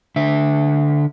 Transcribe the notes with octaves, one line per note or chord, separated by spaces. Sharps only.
D3 E5